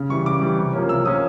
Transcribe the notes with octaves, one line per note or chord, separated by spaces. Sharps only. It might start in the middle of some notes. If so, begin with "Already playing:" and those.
Already playing: C#3
E3 G3 C#6
C#3 D6
E3 G3
C3
F3 A#3 C#4
C3 E6
F3 A#3 C#4 D#6